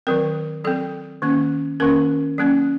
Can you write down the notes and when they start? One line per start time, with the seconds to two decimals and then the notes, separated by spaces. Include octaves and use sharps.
0.07 D#3 F#3 C4 A#4
0.64 F#3 C4 A4
1.22 D#3 A#3 C#4
1.80 D#3 A#3 C#4 A#4
2.38 F#3 A#3 C#4